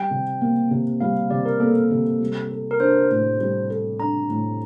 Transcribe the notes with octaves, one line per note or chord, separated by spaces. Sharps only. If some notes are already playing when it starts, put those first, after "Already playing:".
Already playing: G3 G5
C3
A#3
C3
G3 F5
C3 D5
A#4
A#3 A4
C3
G3
A4
A#4
D4 C5
A2
G3
A4
D4 A#5
A2